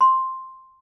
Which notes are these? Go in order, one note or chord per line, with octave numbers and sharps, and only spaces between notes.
C6